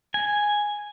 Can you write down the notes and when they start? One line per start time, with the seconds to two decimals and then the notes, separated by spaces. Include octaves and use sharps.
0.14 G#5